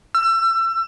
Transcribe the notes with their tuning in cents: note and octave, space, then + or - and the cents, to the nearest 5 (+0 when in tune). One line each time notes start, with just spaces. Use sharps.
E6 +30